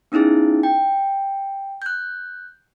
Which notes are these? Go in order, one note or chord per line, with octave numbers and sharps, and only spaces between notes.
B3 C#4 D#4 E4 G#4
G5
F#6 G6